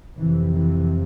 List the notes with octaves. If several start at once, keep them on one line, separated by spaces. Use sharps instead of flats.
F2 C3 E3
E3